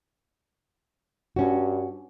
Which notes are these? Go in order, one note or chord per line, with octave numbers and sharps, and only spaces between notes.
G2 C#4 F#4